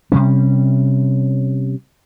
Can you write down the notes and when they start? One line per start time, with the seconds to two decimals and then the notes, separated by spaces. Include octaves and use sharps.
0.12 C3 G3 C#4